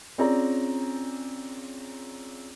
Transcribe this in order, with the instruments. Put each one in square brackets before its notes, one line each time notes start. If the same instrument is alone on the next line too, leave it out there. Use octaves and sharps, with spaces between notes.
[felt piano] C4 C#4 F4 G#4 D5 A#5